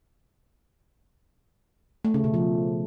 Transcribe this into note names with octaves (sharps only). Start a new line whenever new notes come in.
A3
C#3
B2
F3